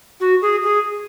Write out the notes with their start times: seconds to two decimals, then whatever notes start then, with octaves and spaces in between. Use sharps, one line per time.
0.20 F#4
0.41 G#4
0.63 G#4